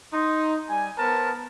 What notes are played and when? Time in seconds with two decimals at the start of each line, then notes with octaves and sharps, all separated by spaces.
0.13 D#4 C6
0.69 G3 G#5
0.98 B3 A#4 C5 A5